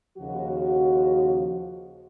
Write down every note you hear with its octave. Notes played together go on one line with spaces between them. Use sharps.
D#2 C#3 F3 F#4